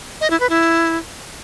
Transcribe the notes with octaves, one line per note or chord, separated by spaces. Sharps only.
D#5
E4
B4
E4